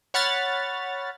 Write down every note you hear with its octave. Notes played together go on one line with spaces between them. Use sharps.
C#5 F#5 B5 F6 A6